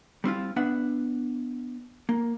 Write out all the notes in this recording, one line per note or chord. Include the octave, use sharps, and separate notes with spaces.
G3 C4 E4 F4
B3 D4 E5 F#5
A#3